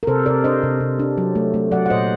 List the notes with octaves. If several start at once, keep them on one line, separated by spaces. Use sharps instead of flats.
A#4
C3 A4 C5
C3 A#4 D5
D4 C5 D#5
C3
C3
D4
F#3
A3
A3
F#3 D5 F#5
F#5
A#2 C5 D#5